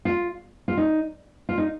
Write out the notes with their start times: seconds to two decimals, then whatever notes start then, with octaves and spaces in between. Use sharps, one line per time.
0.05 F4
0.68 F4
0.77 D#4
1.49 F4
1.58 D#4